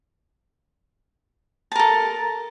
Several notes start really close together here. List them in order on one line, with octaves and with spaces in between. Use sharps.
A5 A#4 A4